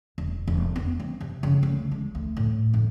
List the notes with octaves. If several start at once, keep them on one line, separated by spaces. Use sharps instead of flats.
E1
E1
B3
C4
C3
C#3
D2
G#3
D2
A2
A2